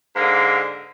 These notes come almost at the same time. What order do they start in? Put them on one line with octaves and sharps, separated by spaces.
G#2 A#3 D3